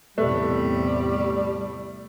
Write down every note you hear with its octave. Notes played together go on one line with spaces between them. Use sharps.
E2 A2 C3 G3 A3